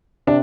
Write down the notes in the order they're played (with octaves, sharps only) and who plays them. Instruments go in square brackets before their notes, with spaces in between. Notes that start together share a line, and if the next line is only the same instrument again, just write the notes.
[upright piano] C3 D4